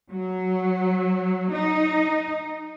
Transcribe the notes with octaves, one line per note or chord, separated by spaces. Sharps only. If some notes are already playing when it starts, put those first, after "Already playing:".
F#3
D#4